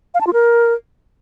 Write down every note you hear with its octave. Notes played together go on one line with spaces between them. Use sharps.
F5
A5
F4
A#4